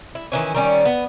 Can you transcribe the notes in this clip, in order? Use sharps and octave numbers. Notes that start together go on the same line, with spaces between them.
E4
D#3 E3 C#4
D#3 G3 C#4
B3